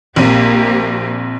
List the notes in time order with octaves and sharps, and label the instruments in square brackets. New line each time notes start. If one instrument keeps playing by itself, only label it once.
[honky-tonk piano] A#1 C4 D#7 [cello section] A#3 G4